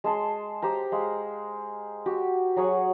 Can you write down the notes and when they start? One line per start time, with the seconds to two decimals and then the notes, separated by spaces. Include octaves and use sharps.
0.04 G#3 A5 C6
0.62 G4 C5 A#5
0.92 G#3 F5
2.06 F#4 G4
2.56 F#3 G#4 C#5 F#5